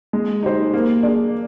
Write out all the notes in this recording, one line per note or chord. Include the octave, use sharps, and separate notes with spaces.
G#3
D#4 G4 C5
A#3
D4 G#4 D5